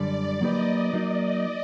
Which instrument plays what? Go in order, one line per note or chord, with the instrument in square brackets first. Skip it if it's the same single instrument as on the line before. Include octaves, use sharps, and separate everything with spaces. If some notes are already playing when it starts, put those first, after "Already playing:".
Already playing: [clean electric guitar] F#2 D3 G3 [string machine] D5
[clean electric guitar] F#3 A#3 D#4 G4 B4 [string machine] D#5
[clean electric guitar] F#3 A#3 D#4